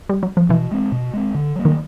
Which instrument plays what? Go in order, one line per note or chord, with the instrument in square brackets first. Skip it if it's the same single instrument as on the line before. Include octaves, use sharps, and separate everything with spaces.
[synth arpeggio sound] G3
F#3
F3
[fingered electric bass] B2 [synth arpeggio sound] E3
[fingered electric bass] G#3 C4
B2
G#3 C4
D3
F#3 A#3
[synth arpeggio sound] D#3